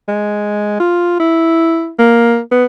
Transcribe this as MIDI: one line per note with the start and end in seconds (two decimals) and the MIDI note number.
0.08 0.76 56
0.80 1.19 65
1.20 1.91 64
1.99 2.39 58
2.52 2.65 59